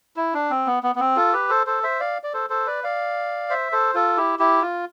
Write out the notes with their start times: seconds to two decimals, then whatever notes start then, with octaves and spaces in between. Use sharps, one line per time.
0.16 E4
0.34 D4
0.50 C4
0.67 B3
0.83 B3
0.95 B3
1.00 C4
1.16 F4 A4
1.33 G4 B4
1.50 A4 C5
1.67 A4 C5
1.83 C5 E5
2.00 D5 F5
2.23 D5
2.34 A4 C5
2.50 A4 C5
2.67 B4 D5
2.84 D5 F5
3.50 C5 E5
3.72 A4 C5
3.94 F4 A4
4.17 E4 G4
4.39 E4 G4
4.62 F4